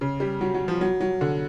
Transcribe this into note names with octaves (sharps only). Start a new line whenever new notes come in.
C#3
G3
F#3
F#3
F3
F#3
F#3
D3